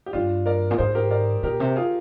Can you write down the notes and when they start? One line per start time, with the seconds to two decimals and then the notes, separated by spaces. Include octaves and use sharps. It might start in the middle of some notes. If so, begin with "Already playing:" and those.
0.06 G4
0.13 G2 D4 F4
0.46 A#4 D5
0.71 A#2
0.78 G#2 G#4 C5
0.95 G4 A#4
1.10 A#4 D5
1.43 A#2 G4 A#4
1.60 C3
1.76 F4 G#4